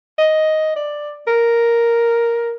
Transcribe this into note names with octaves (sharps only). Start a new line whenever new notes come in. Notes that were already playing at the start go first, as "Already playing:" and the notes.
D#5
D5
A#4